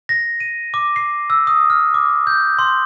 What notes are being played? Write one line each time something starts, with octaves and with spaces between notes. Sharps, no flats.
A#6
D#7
D6
C7
E6
D#6
F6
D6
G6
C6